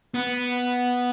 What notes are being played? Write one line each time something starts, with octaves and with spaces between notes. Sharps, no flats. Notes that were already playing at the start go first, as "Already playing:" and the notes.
B3